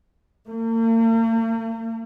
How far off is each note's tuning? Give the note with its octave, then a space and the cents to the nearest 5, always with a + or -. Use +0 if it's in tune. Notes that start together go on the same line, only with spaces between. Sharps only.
A#3 -45